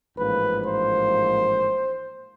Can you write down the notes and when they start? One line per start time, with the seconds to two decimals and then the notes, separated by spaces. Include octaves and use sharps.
0.18 A1 G#2 F3 A#3 B4
0.66 C5